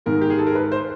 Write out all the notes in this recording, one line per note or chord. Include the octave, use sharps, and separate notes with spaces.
G#2 D#3 A#4
G4
G#4
A4
A#4
B4
C5